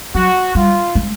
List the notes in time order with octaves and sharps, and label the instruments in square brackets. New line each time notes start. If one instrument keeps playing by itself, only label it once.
[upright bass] F#3 [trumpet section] F#4
[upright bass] G3 [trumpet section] F4
[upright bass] G#3